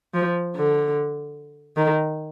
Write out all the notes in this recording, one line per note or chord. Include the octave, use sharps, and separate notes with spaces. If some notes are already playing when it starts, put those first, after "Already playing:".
F3
D3
D#3